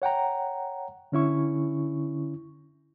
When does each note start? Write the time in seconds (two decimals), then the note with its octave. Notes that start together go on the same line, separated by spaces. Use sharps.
0.02 C#5 F#5 G5 A#5
1.12 D3 C#4 E4 C#6